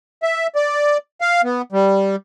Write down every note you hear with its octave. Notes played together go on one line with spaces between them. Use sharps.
E5
D5
F5
B3
G3